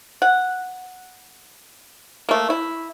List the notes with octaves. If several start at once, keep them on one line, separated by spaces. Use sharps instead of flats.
F#5
A3 A#3
E4